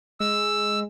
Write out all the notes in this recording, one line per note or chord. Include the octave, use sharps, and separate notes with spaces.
G#3 E6